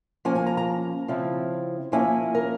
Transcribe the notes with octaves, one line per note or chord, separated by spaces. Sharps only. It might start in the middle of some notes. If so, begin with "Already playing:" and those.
F3 A#3 C#4 G#5
G#5
A#5
A#5
C#3 F3 C4 E4
F3 A#3 C#4 E4 G#5
A#4